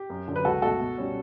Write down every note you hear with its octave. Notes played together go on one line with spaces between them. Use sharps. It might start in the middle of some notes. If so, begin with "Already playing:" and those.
Already playing: G4
F#2
D3 F#3
B4
C#2 F#4 A4
B2 A3 F#4 A4
B2
G3 C#4